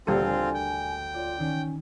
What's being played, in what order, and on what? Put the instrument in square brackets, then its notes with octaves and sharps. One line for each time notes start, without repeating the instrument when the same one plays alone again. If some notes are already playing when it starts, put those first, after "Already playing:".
[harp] D2 A#2 D3 [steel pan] G3 A4 [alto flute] A#3 [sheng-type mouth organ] C4 F4
[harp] A3 [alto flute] G#5
[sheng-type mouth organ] G5
[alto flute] F4 [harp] D5
[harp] D#3 [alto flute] C#4